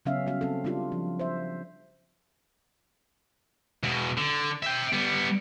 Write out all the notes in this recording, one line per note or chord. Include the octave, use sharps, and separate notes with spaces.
C#3 F#3 B3 C#4 E5 F5
G3 B3 F#4 F5
C4 A4
G3 C4 D4 F4 G4
F3
C5 E5
E2 B2
D3
E5 G5
G3 B3